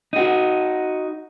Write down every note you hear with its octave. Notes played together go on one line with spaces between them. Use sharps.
D#4 F#4